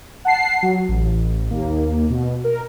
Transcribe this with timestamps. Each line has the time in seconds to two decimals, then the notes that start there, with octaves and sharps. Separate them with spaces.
0.25 F#5 A5 C7
0.63 F#3
0.88 A1
1.51 D#2 A#3
2.10 B2
2.44 A#4